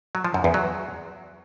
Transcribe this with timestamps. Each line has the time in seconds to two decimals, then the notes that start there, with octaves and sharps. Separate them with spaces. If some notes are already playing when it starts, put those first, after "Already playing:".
0.15 F#3
0.25 F3
0.34 F#2
0.44 E2
0.54 F#3